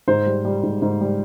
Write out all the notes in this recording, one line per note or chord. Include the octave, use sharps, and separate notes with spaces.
G#2 C5
G3
G3
G#2
G#2
G3